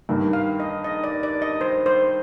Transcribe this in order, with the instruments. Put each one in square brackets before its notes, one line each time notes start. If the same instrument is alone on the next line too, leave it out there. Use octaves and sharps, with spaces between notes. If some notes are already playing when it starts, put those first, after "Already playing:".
[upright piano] G2 D#3 A#3
[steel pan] F5
D#5
D#5
D5
D5
D#5
C5
C5